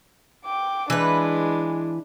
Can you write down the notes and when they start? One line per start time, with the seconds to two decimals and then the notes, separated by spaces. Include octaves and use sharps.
0.46 G5 D6
0.90 E3 G#3 D4 B4